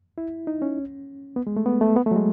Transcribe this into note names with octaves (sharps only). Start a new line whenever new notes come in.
E4
D#4
C#4
B3
G#3
A3
B3
A3
B3
A3
F#3
G#3